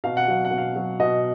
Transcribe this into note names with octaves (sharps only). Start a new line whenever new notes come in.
B2 F5
F#5
F#3 F5
F#5
B2
F5
F#3
B2 D#5